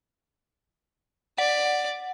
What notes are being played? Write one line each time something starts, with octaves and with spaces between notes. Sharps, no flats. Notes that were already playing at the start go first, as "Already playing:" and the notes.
D5 F#5